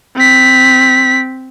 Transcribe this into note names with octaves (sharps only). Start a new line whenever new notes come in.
C4 B6